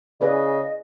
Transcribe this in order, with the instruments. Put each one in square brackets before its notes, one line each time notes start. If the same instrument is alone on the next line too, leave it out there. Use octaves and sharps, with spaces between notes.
[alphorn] C#3 [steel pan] G#4 B4 D5 [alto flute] D#5